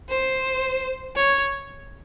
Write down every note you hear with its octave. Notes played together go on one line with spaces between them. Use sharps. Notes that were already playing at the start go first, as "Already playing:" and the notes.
C5
C#5